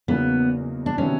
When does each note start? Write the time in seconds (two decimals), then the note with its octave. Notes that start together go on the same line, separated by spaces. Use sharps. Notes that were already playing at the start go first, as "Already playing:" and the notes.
0.08 E2 C#3 F#3 A#3 B3 D#4
0.86 D4
0.98 C3 D#3 F#3 B3 C#4 D4